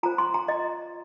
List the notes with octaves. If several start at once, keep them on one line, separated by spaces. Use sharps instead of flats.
F4 C5 A#5
C6
A#5
D#5